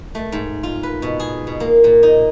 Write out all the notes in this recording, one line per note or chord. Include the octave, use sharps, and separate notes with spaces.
A3
G#2
F4
B4
B2
G#4
B2
A#3
A#2
D#4